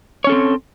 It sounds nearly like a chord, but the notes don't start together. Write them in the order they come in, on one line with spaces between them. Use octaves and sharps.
C#5 C#4 A4 C4